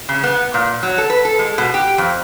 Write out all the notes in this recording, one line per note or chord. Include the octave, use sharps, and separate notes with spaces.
C#3
B3
A#2
F#3
A4
B4
A4
G#3
B2
G4
F2